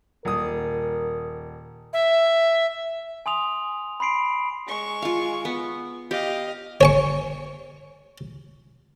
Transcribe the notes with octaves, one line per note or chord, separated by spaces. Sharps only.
D#1 A#4 D#6
E5
G#5 C6 D#6 F7
B5 C6 C7 D7
G#3 C#6
F4 F5
B3
G4 D#5 F5
C#5 G#5 C#6